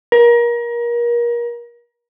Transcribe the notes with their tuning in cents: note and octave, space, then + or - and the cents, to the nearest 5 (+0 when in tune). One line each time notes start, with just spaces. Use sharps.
A#4 +30